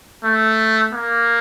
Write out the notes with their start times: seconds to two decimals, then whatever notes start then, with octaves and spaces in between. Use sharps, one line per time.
0.24 A3
0.93 A#3